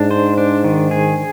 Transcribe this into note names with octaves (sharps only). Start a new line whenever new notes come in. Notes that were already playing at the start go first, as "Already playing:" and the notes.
Already playing: G#2 D4
C5
D4
D#3
G#4